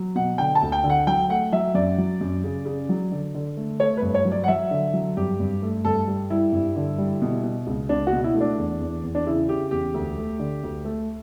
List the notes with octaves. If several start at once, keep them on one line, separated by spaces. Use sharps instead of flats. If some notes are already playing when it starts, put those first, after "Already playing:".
Already playing: F#3
B2 F#5
D3 G5
A5
D2
G5
D3
F#5
F#3 G5
A3 F#5
F#3 E5
F#2 D5
F#3
F#2
C#3
C#3
F#3
D3
D3
A3
A3 C#5
G2 B4
C#5
F#3
D5
F#5
F#3 E5
D3
F#3
G2 G4
G2
A3
G2 A4
G3
G3 E4
G2
D3
G3
B2
B2
C#2
C#2 D4
F#4
B2
E4
A3
D4
E2
E2
E2
D4
C#3 E4
C#3 G4
E2 G4
D2
A3
D3
D2
A3